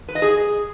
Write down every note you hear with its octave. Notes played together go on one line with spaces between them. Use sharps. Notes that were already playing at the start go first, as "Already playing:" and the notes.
B4
D#5
G#4